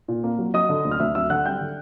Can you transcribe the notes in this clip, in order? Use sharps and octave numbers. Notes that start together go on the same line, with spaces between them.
A#2
A#3
F#3
F#3 D#5 D#6
D3
D2
F6
D2 E5 E6
F#3 E5 E6
D3 F#5 F#6
G3 G5 G6
D3